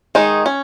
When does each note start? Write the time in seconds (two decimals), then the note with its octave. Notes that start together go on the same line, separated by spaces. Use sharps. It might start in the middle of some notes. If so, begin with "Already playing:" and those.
0.15 D#3 G#3 D#4
0.46 C#4